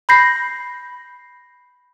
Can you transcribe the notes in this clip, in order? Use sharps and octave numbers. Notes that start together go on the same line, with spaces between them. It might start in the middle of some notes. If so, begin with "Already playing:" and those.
B5 G6 A#6 C7